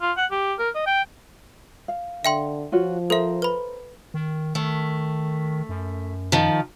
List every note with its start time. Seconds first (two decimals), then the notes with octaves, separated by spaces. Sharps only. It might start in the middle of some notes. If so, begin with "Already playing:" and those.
0.02 F4
0.17 F#5
0.31 G4
0.59 A#4
0.75 D#5
0.86 G5
1.88 F5
2.25 D3 E5 G5 C6
2.72 F3 F4 F#4 C#5
3.10 A4 A#4 C5 E5
3.42 B4 B5
4.14 D#3
4.55 D#3 A3
5.69 F#2
6.32 D#3 F3